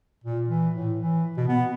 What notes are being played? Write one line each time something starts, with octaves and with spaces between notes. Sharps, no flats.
A#2
E3
A2
E3
B2
B3